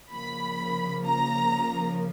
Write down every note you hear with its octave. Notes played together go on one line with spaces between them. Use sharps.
C#3 F3 A#3 B5
A#5